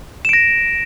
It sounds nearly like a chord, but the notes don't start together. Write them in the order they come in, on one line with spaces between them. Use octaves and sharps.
E7 D7 A#6